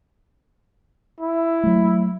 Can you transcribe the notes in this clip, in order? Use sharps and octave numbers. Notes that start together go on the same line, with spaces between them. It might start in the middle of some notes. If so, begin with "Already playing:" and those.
E4
F#3 A3